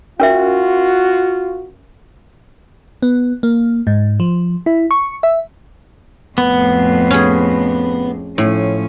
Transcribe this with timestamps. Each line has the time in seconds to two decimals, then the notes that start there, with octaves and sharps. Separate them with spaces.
0.20 C#4 F4 F#4 A#4 E5
3.02 B3
3.43 A#3
3.87 G#2
4.20 F3
4.66 E4
4.91 C#6
5.23 E5
6.38 F2 A2 B3
7.11 C#4 G#4
8.38 A2 F3 C#4